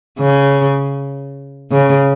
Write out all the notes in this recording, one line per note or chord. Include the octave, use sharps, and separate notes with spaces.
C#3
C#3